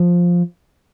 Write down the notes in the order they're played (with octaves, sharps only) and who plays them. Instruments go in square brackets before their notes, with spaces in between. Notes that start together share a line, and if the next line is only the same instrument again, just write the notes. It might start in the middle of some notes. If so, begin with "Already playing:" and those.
Already playing: [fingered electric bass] F3